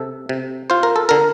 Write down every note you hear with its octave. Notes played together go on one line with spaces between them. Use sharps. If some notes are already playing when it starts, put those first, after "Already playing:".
Already playing: C3 A4
C3
F4 C5
A#4
A4
D3 A#4